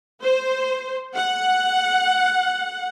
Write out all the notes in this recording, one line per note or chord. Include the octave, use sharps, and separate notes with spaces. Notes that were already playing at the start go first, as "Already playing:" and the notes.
C5
F#5